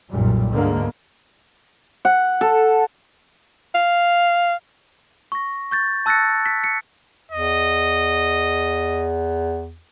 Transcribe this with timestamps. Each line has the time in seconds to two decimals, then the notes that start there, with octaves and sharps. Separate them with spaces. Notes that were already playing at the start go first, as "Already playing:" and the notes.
0.11 B1 F#2 A#2 G3
0.54 D2 G#2 D3 G#3 A#3
2.05 F#5
2.41 A4
3.74 F5
5.32 C#6 A#6
5.71 C#6 G6 A6
6.06 A5 E6 F#6 A6 A#6 C#7
6.46 B6
6.64 C#7
7.32 E2 D#5